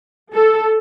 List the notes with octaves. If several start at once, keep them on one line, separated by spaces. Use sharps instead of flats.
A4